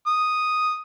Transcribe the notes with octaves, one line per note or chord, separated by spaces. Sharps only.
D#6